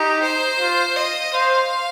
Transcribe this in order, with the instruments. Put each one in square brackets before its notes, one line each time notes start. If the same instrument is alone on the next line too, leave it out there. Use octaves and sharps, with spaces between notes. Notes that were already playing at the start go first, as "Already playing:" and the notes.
Already playing: [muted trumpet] D#4 [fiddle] G4
[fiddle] C5
[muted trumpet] F4
[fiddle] D#5
[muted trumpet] C5 [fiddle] F5